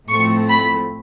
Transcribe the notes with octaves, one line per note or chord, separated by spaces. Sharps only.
A2 F3 A3 C4 C#6
B5